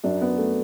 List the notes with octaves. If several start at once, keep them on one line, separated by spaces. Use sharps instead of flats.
F#2 F#3 D4
B3
A3